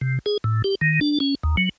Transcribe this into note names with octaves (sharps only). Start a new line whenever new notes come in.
C3
G#4
A2
G4
D#3
D4
C#4
D#2
F#3